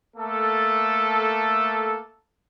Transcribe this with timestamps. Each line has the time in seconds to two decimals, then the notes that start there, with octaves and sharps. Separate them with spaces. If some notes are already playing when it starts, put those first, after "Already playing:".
0.17 A3 A#3 A4